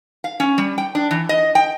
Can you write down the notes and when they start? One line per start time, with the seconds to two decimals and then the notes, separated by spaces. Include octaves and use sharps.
0.24 F5
0.40 C#4
0.58 G3
0.78 G5
0.95 D4
1.11 E3
1.29 D#5
1.55 G5